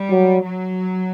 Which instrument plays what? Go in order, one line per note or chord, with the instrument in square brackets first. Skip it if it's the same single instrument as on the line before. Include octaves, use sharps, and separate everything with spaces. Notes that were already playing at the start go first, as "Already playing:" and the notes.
Already playing: [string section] G3
[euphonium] F#3
[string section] F#3